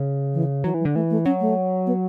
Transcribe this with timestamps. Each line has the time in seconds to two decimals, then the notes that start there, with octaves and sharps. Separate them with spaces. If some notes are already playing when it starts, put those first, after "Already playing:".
Already playing: C#3
0.34 E3
0.64 E3 F#3
0.74 E3
0.80 F#3
0.85 D3
0.94 E3 A3
1.10 A3
1.25 F#3 C#4
1.40 A3
1.86 B3